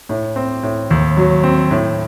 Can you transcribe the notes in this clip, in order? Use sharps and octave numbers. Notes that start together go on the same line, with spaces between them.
A2
C4
A2
D#2
F#3
C4
A2